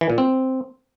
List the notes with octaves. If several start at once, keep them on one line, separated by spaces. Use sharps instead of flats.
E3
A#2
C4